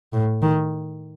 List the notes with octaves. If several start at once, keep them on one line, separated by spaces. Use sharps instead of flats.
A2
D#3